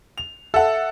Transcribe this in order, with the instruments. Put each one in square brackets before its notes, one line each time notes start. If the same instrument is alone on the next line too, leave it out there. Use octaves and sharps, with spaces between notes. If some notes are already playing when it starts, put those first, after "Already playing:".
[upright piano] F7
[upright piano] A4 F#5 [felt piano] E5